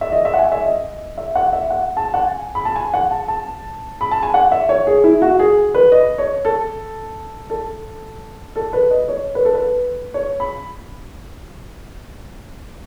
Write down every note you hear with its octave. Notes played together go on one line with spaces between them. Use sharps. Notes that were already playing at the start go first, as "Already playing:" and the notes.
E5
D#5
E5
F#5
G#5
E5
D#5
E5
F#5
E5
F#5
A5
F#5
G#5
B5
A5
G#5
F#5
A5
A5
B5
A5
G#5
F#5
E5
C#5
G#4
E4
F#4
G#4
B4
D#5
C#5
A4
A4
A4
B4
D#5
C#5
B4
A4
B4
C#5
B5